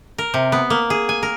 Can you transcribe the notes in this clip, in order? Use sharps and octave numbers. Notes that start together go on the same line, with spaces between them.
A#4
C3
B3
A#3
G#4
G#5
A#4